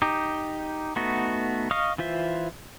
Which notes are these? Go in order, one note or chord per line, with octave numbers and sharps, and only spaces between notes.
D#4 G4
A3 B3 D#4 F#4
D#5 F5 C#6 D#6 F6
E3 F4 C5 E5